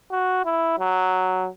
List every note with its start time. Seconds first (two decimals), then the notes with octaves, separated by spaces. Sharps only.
0.12 F#4
0.45 E4
0.79 F#3